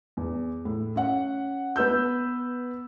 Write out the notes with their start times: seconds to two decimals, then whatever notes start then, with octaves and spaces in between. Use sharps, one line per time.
0.17 E2
0.65 A2
0.96 C#4 F#5
1.76 B3 B4 E6 G6